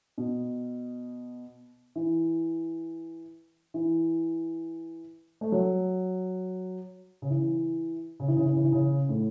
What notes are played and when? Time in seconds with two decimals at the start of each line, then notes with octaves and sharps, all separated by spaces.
0.18 B2
1.96 E3
3.74 E3
5.41 A3
5.52 F#3
7.22 C#3
7.30 E3
8.20 C#3
8.28 E3
8.37 C#3
8.46 E3
8.55 C#3
8.65 E3
8.73 C#3
9.09 A2